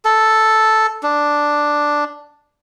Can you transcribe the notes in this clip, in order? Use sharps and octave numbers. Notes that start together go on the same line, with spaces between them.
A4
D4